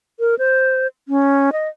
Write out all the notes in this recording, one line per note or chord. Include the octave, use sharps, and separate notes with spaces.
A#4
C5
C#4
D#5